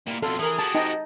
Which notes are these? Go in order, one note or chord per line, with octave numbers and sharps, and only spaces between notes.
A#2 G3 E4
F2 B2 A4 F5 C6
C3 E3 F#3 G#4 A#4
F#4 G4 A5
C4 D#4 D#5 A5